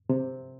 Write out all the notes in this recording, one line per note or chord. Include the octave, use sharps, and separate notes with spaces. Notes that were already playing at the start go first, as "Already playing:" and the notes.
C3